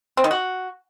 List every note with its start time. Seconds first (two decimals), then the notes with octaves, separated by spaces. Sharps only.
0.17 C4
0.24 D#3
0.31 F#4